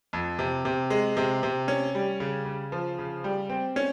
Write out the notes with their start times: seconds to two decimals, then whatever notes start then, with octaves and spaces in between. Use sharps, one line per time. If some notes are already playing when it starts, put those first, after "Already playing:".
0.13 F2
0.39 C3
0.65 C3
0.90 G#3
1.17 C3
1.43 C3
1.68 C#4
1.95 G3
2.20 C#3
2.45 C#3
2.72 F3
2.99 C#3
3.24 G3
3.50 C4
3.76 C#4